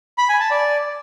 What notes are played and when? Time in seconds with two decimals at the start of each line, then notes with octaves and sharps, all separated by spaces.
0.18 B5
0.29 G#5
0.40 A5
0.51 D5